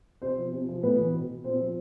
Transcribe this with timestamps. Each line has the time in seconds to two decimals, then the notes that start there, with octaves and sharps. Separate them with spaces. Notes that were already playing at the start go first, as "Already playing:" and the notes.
0.22 C3 C4 C5
0.38 F3
0.53 C3
0.68 F3
0.83 A2 B3 B4
0.98 E3
1.13 B2
1.44 A#2 C4 C5
1.60 F3